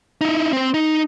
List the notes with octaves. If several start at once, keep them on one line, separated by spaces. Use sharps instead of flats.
D#4 E4
C4 C5
D#4